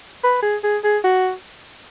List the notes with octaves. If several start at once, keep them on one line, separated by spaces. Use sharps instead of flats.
B4
G#4
G#4
G#4
F#4